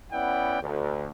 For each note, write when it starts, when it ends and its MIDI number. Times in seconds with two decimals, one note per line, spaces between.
0.13 0.60 59
0.13 0.60 61
0.13 0.60 64
0.13 0.60 74
0.13 0.60 78
0.13 0.60 79
0.62 1.11 38